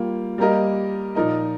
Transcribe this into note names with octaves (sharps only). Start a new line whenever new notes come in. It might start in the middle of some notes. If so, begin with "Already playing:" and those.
Already playing: G3 A#3 F4
G3 A#3 G4 A#4 D#5
A#2 F3 D#4 A#4 D#5